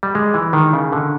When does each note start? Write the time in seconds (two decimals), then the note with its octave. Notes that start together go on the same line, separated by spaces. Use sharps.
0.03 G3
0.15 G#3
0.34 E3
0.53 D#3
0.73 C#3
0.93 D3